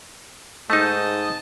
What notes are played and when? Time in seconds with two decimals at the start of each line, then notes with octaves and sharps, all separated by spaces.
0.70 G#2 A3 D#4 D#5 A5